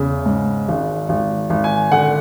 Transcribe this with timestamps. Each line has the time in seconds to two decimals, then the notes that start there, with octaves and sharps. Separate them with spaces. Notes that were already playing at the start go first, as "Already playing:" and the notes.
Already playing: E2 C#3
0.26 G#2
0.68 G#1
1.09 G#1
1.50 G#1
1.64 G#5
1.92 D3 F#5